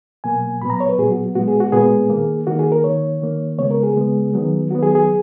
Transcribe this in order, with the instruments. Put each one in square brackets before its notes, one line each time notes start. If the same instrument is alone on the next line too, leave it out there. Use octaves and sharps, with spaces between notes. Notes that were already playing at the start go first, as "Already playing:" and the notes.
[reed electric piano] B2 F#3 A#3 G#5
A#2 F#3 B3 B5
A#5
C#5
B4
A#2 F#3 B3 G#4
F#4
A#2 G#3 B3 F#4
G#4
F#4
A#2 G#3 B3 G#4
D#3 A#3
D#3 A#3 F#4
G#4
A#4
D#3 A#3 C#5
D#3 A#3
C#3 G#3 B3 C#5
A#4
G#4
C#3 G#3 B3
D#3 F#3 B3
D#3 F#3 B3 F#4
G#4
G#4